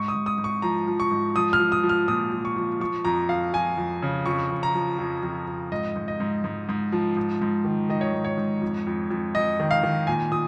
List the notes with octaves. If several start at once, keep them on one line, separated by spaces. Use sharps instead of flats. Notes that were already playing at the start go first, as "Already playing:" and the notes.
Already playing: G#2 C#6
D#6
G#2
D#6
G#2
C#6
F3 A#5
F3
C#6
G#2
F3 D#6
F6
F3
D#6
F3
F6
A#2 D#6
F3
C#6
F3
F3 C#6
F2 A#5
F2 F5
F3 G#5
F2
C#3
F2 C#6
F2
A#5
F3
F2
F2
F2
G#2 D#5
G#2
D#5
G#2
G#2
G#2
F3
G#2
G#2
D#3
D#3 D#5
C#5
G#2
C#5
G#2
F2
F2
F2
F2 D#5
D#3
F5
D#3
A#2 G#5
A#2 D#6